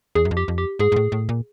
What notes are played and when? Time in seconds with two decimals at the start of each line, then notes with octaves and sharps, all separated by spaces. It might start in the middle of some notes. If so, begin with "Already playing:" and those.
0.15 E2 G#4
0.25 F#2
0.31 F2
0.37 G4
0.48 F2
0.58 G4
0.79 G#2 G#4
0.92 G#2
0.96 A2
1.12 A2
1.29 A#2